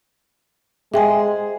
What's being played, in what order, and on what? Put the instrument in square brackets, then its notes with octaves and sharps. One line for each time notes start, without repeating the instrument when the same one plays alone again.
[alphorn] G#3 [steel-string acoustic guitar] G#4 C5 [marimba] E5 G5 G#5